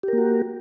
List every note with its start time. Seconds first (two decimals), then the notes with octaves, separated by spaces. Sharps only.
0.03 G4
0.08 A#4
0.13 A#3
0.18 F#4